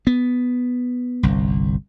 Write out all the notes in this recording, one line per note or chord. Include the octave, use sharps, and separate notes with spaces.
B3
G1 C2